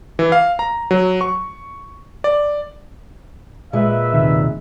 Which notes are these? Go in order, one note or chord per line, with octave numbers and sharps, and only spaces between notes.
E3
F5
A#5
F#3
C#6
D5
A#2 G#3 B4 E5
D#2 C3 D#3